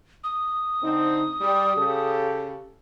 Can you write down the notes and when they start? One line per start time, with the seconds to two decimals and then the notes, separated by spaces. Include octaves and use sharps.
0.24 D#6
0.83 D3 C4 D#4
1.41 G3
1.76 C#3 G4 A4